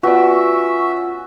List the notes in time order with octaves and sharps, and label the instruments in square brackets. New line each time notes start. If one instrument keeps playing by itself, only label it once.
[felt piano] B3 B4 D5 [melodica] C#4 E5 [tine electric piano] F4 [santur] F#4